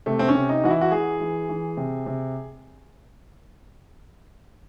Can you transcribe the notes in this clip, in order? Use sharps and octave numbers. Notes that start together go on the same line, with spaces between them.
C3 A3
C4
C#4
C3
D#4
E3 F#4
E4
F#4
E3 G#4
E3
E3
C3
C3